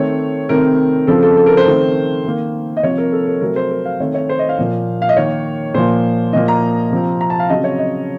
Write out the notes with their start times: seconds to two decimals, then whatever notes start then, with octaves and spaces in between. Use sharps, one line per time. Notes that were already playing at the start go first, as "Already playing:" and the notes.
Already playing: D#3 A3 C4 C#5
0.49 C3 D#3 A3 C4 A#4
1.07 C#3 F3 C4 A4
1.23 A4
1.37 A4
1.46 A#4
1.57 C5
1.66 D#3 A3 C4
2.25 D#3 A#3
2.77 D#5
2.83 C3 F3 C4 C#5
2.98 A#4
3.12 A4
3.27 A#4
3.41 C3 F#3 A3 C4 A#4
3.56 C5
3.71 A#4
3.85 F5
4.00 D#3 A3 C4 C#5
4.15 C#5
4.29 C5
4.39 D#5
4.49 F5
4.58 A#2 F3 A#3
5.02 F5
5.09 D#5
5.16 D#3 A#3 C#5
5.74 A#2 F3 A#3 C5
6.33 A#2 F3 A#3 D#5
6.48 A#5
6.91 C3 F3 C4
7.21 A#5
7.30 A5
7.39 F5
7.50 C#3 F#3 C4 D#5
7.64 C#5
7.79 D#5